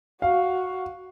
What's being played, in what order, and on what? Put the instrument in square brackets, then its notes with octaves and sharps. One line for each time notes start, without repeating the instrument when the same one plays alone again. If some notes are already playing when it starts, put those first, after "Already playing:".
[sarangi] F#4 [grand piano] F5